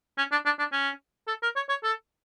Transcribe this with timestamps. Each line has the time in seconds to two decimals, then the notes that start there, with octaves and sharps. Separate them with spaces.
0.18 C#4
0.32 D4
0.46 D4
0.59 D4
0.73 C#4
1.28 A4
1.43 A#4
1.56 C#5
1.69 C#5
1.84 A4